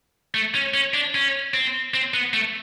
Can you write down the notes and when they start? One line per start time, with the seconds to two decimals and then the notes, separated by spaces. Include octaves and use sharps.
0.34 A3
0.55 C#4
0.74 C#4
0.94 D4
1.15 C#4
1.54 C4
1.94 C4
2.14 B3
2.33 A3